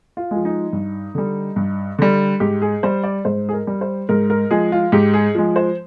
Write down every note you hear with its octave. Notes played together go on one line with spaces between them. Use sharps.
F4
F3 G#3
D#4
G2
D3 G3
G2
D3 G3
G#2 G4
G#4
G3 C5
D5
G#2 C5
G#4
A#4
G3
C5
G#2 A#4
A#4
F3 G#3 G#4
F4
G#2 G4
G#4
F3 G#3
C5